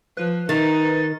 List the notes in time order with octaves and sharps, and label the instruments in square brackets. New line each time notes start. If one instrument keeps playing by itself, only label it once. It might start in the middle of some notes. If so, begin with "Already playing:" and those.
[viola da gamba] F3 [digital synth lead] B4
[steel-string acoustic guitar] D#3 [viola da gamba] D#4 [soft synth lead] A6